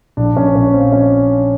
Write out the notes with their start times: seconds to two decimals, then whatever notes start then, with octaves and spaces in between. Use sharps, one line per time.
0.17 A#1 D4
0.36 A#1 C#4
0.55 A#1 C#4
0.74 F3 C4
0.93 F3 C#4